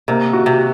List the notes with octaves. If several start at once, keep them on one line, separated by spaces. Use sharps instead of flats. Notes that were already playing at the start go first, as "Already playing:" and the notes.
C3 A#3
F#4
C3